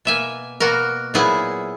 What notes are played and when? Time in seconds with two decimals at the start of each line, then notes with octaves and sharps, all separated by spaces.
0.05 B2 A#3 E5 G#5
0.60 B2 A#3 F#4 A#4
1.14 A#2 F#3 B3 E4 G#4